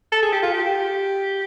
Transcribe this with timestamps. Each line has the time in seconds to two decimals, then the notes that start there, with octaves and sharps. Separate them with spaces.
0.12 A4
0.23 G#4
0.33 G4
0.43 F4
0.54 G4